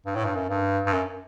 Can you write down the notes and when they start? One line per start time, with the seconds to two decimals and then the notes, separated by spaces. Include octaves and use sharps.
0.06 G2
0.15 A2
0.25 G2
0.35 F#2
0.49 G2
0.86 G2
0.93 F#2